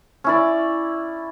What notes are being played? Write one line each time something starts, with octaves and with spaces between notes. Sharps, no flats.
C#4 E4 D5